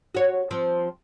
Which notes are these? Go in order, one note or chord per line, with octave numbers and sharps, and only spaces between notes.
F#4 C#5
F3 C4